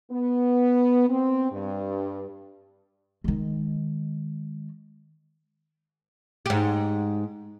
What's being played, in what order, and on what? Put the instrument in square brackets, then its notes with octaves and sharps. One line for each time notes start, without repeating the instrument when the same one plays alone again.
[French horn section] B3
C4
G2
[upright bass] D#3 G#3
[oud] G#2 G4